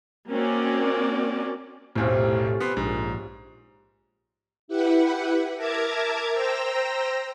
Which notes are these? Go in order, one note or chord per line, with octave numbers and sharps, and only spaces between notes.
A#3 C4 C#4 F#4 D5
F1 B1 A2 C3 C#4 F4
B3 C4
A#1 G#2
E4 G4 B4 F#5
A#4 E5 A5 A#5 D6 G#6
C5 G5 A#5 E6 A#6